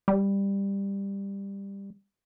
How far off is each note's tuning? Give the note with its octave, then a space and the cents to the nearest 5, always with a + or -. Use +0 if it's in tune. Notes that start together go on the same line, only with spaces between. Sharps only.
G3 +15